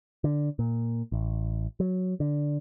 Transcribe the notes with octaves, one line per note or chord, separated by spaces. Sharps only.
D3
A#2
A1
F#3
D3